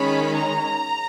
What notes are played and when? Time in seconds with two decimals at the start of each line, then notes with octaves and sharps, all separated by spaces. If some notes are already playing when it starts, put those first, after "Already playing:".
Already playing: D#3 G#3 C#4 B5
0.35 A#5